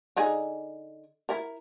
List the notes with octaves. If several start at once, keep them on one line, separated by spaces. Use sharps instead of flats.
D3 D#4 G#4
E4 A#4